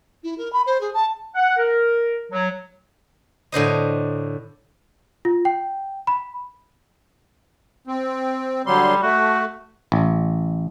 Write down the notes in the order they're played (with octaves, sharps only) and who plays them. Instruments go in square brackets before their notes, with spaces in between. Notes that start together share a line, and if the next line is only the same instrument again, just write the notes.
[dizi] E4
A#4
B5
C5
G#4
A5
[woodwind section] F#5
A#4
F#3
[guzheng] A2 D3 C5 D#5
[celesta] F4
G5
B5
[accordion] C4
[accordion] D3 F#3 C6 [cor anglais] G3
[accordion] A3 [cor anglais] F#4
[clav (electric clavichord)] A1